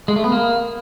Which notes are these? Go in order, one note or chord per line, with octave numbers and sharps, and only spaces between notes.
G#3
A3
B3
A#3